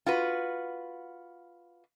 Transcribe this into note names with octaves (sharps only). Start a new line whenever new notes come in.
F4 F#4 B4